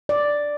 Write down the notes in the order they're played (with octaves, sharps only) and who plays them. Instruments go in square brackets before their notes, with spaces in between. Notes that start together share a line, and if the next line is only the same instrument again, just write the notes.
[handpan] D5